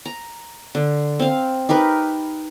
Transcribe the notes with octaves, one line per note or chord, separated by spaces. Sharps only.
A#5
D3
C4 F5
D#4 G4 A#4 B4